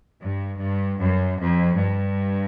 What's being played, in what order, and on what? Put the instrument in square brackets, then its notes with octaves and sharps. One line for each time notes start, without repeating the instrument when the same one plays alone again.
[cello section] G2
G2
F#2
F2
G2